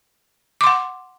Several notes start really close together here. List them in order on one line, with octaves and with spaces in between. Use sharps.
D6 C6 F#5